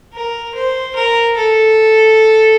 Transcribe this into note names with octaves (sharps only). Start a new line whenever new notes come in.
A#4
C5
A#4
A4